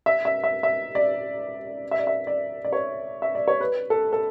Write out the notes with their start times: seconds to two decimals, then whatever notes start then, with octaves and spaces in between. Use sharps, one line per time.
0.06 E5
0.25 E5
0.44 E5
0.63 E5
0.95 D5
1.91 E5
1.99 D5
2.07 E5
2.27 D5
2.65 D5
2.73 C#5
3.22 E5
3.35 D5
3.48 C#5
3.61 B4
3.90 A4
4.13 A4